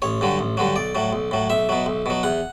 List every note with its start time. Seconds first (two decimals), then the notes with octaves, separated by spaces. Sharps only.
0.02 A1 C#5
0.21 G2 D3 F#3
0.39 A1
0.57 G2 D3 F#3
0.76 B1 D5
0.95 A2 F#3
1.13 B1
1.31 A2 F#3
1.50 B1 E5
1.69 B2 F#3
1.86 B1
2.06 B2 F#3
2.23 E2 F#5